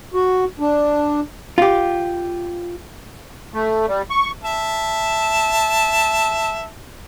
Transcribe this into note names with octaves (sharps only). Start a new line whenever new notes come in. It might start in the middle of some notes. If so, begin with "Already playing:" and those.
F#4
D4
F4 G4
A3
G3
C#6
E5 A5